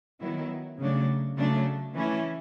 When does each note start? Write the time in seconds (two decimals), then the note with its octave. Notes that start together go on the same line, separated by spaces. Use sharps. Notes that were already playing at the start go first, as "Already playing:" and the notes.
0.20 D#3 F#3 B3 E4
0.78 C#3 F#3 A3 D4
1.37 C#3 F#3 A3 D4
1.94 E3 A3 C#4 E4